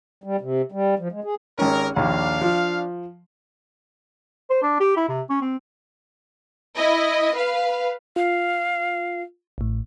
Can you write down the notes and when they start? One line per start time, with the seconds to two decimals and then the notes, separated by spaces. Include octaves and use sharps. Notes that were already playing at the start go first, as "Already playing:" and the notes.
0.24 G3
0.41 C3
0.72 G3
0.99 F3
1.12 G#3
1.24 G#4
1.59 G#1 G#3 C#4 G4 A#4
1.96 A#1 D#2 D4 F5
2.41 F3
4.50 C5
4.62 D4
4.80 G4
4.97 E4
5.09 C3
5.30 C#4
5.41 C4
6.76 E4 D#5
7.34 B4 F5
8.16 F4 F5
9.58 A1 A2